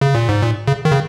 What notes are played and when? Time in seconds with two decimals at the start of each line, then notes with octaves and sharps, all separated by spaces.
0.01 C#3
0.15 A#2
0.29 G#2
0.42 A#2
0.68 C#3
0.85 D#3
0.92 C#3